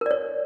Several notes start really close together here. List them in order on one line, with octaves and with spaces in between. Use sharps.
A#4 D5 C#5